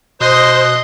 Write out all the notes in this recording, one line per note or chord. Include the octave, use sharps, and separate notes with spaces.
B2 C5 D#5 C6 D#6 F#6